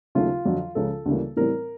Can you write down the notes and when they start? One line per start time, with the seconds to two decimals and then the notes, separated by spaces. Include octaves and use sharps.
0.15 D#2 C#3 F#3 A3 F4
0.45 F2 D3 F#3
0.75 C#2 C#3 F3 A4
1.06 D2 C#3 E3 G3 A#3
1.36 A2 E3 G3 C4 A#4